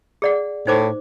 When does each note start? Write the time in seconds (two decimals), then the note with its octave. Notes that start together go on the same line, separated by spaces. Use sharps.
0.22 G#4 D5 F#5
0.67 A2 D#4 C5 D6